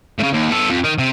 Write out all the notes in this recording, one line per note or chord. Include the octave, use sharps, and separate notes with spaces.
A2 C#3
D#2
B3 A4
F2
D#3
C3